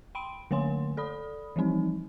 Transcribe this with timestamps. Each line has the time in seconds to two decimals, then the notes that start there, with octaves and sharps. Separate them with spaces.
0.15 G5 B5 C6 D7
0.51 D3 A3 A#3 C#5 G#5 C6
0.97 A4 D5 B5 D#6
1.56 E3 F3 G3 C4 D#4